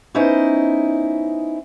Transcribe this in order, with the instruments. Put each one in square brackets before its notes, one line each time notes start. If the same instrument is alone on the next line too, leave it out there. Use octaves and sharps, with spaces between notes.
[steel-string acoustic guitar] B3 C#4 D#4 E4 C5 D#5